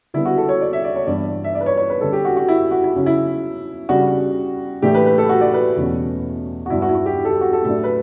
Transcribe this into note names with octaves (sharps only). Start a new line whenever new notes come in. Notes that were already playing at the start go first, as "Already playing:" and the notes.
D3 G3 B3 E4
F#4
A4
C#5
D5
E5
D5
C#5
G2 E3 B3 D4 D5
E5
D5
B4
C#5
C#5
B4
D3 G3 C#4 A4
G4
F#4
F#4
E4
F#4
E4
C#3 F#3 C#4
E4
C#3 G3 D4 F#4
A2 E3 A3 D4 G4
B4
B4
A4
F#4
D5
B4
E2 B2 A3 C#4
F#4
G2 F#3 B3 D4 E4
F#4
E4
F#4
G4
A4
G4
F#4
A4
A2 F#3 A3 D4 A4
B4